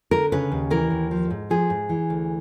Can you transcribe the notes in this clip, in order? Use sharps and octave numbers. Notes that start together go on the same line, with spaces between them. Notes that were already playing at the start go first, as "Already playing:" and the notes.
D3 A#4
C#3 B4
D#2
E3 A#4
D#2
F3
G#2
F3 G#4
G#2
E3
D2